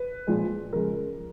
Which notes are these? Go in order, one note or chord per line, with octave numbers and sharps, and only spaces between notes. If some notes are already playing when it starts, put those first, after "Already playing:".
Already playing: B4
A#2 F3 G#3
C#3 F3 G#3 A#4